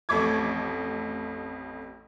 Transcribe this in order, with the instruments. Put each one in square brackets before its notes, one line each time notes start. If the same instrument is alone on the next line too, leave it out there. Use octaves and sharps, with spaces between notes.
[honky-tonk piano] A1 F2 A3 C#6 D6 G#6